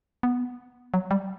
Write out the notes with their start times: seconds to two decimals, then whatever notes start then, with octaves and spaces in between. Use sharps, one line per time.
0.23 B3
0.94 F#3
1.11 G3